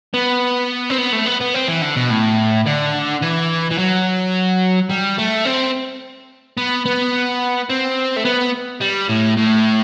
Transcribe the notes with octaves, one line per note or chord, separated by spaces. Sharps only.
B3
C4
B3
A3
B3
B3
C4
E3
D3
B2
A2
D3
E3
E3
F#3
G3
A3
C4
B3
B3
C4
A3
B3
G3
A2
A2